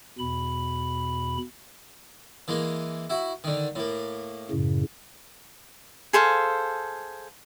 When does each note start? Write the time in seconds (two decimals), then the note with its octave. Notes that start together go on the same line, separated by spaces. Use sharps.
0.19 E2 B2 B5
2.48 E3 G#3 A#3
3.10 E4 F#4
3.44 D3 D#3
3.75 A2 A#3
4.51 F#2 A2 C#3
6.13 G#4 A4 C5 F5